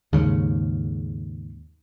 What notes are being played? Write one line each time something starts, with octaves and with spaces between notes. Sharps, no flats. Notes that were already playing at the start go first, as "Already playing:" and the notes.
D#2 G#2 C#3